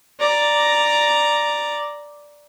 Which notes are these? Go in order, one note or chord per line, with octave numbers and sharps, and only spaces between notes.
D5 A#5